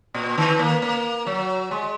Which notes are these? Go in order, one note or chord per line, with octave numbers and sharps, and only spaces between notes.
A#2
D#3
A#3
A#3
F#3
G#3